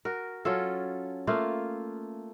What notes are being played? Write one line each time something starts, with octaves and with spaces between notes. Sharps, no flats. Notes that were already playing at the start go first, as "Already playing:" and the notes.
F#4 A#4
F#3 C#4 F4 A4
A3 A#3 F4